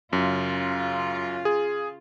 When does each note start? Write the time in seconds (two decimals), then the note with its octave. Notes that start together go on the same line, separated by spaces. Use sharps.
0.13 F#2 C#3 F4
1.45 G#4